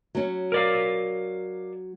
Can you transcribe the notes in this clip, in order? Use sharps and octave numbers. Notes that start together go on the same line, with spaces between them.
F#3 C#4
A#4 D5 F5